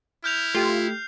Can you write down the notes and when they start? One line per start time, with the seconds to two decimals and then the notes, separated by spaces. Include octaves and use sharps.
0.24 E4 F6 G6 F7
0.55 A3 F4 G4 C7